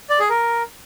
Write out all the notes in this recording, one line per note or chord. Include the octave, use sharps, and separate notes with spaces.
D5
G#4
A#4